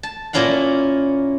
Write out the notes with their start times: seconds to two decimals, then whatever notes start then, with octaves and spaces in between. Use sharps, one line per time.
0.03 A5
0.33 A#2 A#3 C#4 E4 F5 F#5